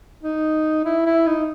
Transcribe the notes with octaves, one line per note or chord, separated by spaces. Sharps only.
D#4
E4
E4
D#4